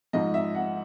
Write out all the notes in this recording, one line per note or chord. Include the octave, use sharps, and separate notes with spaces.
G#2 F3 D#5
E5
F#5